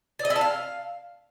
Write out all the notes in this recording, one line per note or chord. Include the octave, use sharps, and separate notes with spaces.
D5
D#5
E4
A5
F5